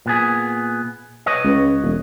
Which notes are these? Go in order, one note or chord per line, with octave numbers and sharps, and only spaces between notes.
A#2 B3 G#4
B4 C#5 D#5
C#2
E1